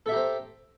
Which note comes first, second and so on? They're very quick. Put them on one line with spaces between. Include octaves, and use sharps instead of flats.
A4 E5 G4 A#5 C5